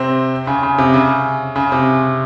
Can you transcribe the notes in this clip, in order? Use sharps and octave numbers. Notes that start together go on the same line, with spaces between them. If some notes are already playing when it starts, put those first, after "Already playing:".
Already playing: C3 C4
C#3
C#3
C3
C#3
C#3
C3